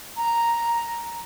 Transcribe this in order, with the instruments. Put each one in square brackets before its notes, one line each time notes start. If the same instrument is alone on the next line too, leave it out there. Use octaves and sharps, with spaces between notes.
[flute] A#5